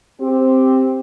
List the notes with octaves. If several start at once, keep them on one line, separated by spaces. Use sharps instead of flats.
C4 G4